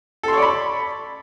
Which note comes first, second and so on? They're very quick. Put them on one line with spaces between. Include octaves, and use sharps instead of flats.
A4 C6 C#5 D5 B5